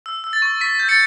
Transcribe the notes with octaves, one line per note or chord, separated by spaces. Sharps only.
E6
E6
A6
C#6
C#6 B6
G6
A6 C#7